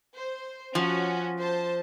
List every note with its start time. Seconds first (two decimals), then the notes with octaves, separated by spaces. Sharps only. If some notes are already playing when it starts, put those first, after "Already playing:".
0.16 C5
0.75 F3 C#4 F#4
1.40 C5 A5